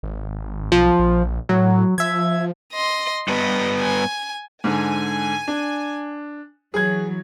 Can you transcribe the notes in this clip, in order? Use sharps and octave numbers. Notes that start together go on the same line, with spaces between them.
G#1
B1 F3
A#1
A2 F#3
F3 E5 G#6
D#5 C6
G2 B3 D#5
G#5
G#2 D3 G#5
D4
E3 F#3 G#4 G#6